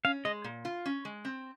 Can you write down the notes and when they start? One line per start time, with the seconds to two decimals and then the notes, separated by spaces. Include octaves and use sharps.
0.04 C#4 F5
0.25 G#3 D#5
0.44 A#2
0.65 F4
0.86 C#4
1.05 G#3
1.25 C4